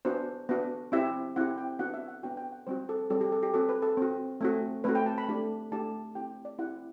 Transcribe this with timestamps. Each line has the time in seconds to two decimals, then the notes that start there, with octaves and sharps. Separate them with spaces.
0.05 B3 D4 F#4 C5
0.49 B3 D4 F#4
0.92 C4 E4 G4 E5
1.36 C4 E4 G4 F#5
1.58 G5
1.79 B3 D4 F#4 F#5
1.94 E5
2.08 F#5
2.23 B3 D4 F#4 G5
2.37 G5
2.52 F#5
2.67 G3 C4 F#4 C5
2.89 A4
3.10 G3 C4 F#4 A4
3.21 G4
3.32 A4
3.43 G4
3.54 C4 F#4 A4
3.69 B4
3.82 A4
3.97 C4 F#4
4.41 A3 C4 F#4
4.84 A3 C4 F#4 B4
4.95 G5
5.06 A5
5.18 B5
5.29 A3 D4 G4
5.72 A3 D4 G4 A5
6.15 C4 E4 G4 G5
6.45 D5
6.59 C4 E4 G4 F#5